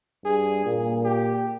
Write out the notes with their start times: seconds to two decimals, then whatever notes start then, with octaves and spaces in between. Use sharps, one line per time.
0.25 G2 G#4
0.65 A#2
1.04 G4